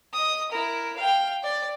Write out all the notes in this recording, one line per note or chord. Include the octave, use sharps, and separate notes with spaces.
D#5 D#6
E4 A#4
F5 G5
D5